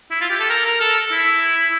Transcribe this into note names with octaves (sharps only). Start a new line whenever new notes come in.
E4
F4
G4
A4
A#4
A#4
A4
E4